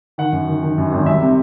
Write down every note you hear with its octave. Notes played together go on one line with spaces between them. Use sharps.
D#3 F#5
F#2
D#3
D#3
F#2
G#1
C2 E5
C3